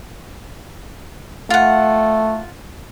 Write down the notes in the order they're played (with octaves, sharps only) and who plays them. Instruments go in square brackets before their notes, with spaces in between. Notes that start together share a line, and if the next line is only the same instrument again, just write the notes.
[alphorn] A3 [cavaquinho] F4 F#5